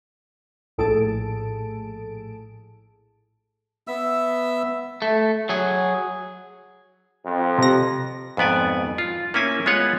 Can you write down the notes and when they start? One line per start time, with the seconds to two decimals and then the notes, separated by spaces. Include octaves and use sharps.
0.78 A#1 A2 G#4 A4 A5 D7
3.88 B3 E5 E6
5.02 A3
5.49 F#3 G#4
7.26 F2
7.58 C3 A#6
8.37 F2 G#2 B3 D5 G#5
8.98 F4
9.34 A#3 C#4 E4 G#5
9.66 G#3 B3 F4 B4 C#5 F#5